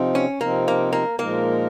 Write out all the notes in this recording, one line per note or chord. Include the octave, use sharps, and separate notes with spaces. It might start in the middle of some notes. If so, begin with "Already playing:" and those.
Already playing: C3 F3 C4 D#4
C#4
C3 F3 A#3 C4 D#4
A#3
A#3
A#2 F3 G#3 A#3 D#4 A#4